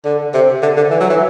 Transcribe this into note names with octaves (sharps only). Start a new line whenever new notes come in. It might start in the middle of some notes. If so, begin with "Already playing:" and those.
D3
C3
D3
D3
E3
F#3
E3